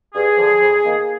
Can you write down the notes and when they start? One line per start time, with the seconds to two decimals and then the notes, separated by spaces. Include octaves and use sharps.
0.14 G2 G#4
0.37 D3 F3
0.61 F2
0.84 D#3 A#3